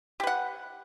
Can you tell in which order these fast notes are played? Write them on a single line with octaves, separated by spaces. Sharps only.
G4 B4 F#5